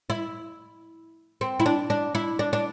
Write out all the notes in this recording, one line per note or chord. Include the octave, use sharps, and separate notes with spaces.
E4
C4
E4
D4
D4
E4
D4
D4